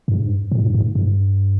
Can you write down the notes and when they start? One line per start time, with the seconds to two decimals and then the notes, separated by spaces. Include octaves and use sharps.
0.08 G2
0.18 G#2
0.27 G2
0.51 A#2
0.60 G#2
0.67 G2
0.74 G#2
0.95 G2